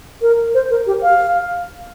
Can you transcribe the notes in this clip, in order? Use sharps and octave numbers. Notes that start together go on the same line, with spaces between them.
A#4
C5
A#4
G4
F5